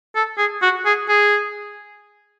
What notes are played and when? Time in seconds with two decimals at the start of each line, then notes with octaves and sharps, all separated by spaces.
0.16 A4
0.38 G#4
0.62 F#4
0.85 G#4
1.09 G#4